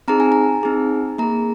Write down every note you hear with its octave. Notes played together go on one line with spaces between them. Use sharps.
C4 D#4 G#4 A#5
G#5
A#5
C4 D#4 G#4
A#3 G#4 A#5